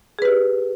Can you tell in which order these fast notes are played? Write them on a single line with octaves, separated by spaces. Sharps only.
G#4 B4 G4